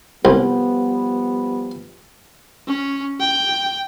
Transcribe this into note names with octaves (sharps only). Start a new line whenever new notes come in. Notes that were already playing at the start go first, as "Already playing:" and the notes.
C2 F3 G3 B3
C#4
G5